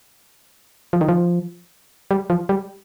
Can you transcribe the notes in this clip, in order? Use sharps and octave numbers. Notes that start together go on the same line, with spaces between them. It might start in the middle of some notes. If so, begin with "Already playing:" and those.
F3
D#3
F3
G3
F3
G3